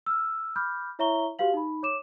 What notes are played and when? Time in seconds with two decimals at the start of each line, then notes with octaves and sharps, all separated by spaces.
0.06 E6 F6
0.56 B5 D6 F6 G6
0.99 E4 C#5 E5 A#5 C#6 G7
1.39 F#4 G4 B4 F5 F#7
1.53 D#4 B5
1.83 C#5 D6 E7